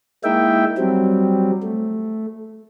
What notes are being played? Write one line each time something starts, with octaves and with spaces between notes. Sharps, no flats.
G#3 A#3 D#4 E4 E5 G5
F#3 G3 C4
A3